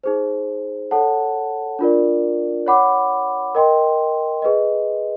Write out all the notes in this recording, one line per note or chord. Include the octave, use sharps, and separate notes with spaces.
D#4 G#4 C5
A4 C#5 F#5 A5
D4 F4 A#4 D5
C#5 F#5 B5 D6
A#4 D#5 G5 C6
G#4 B4 D#5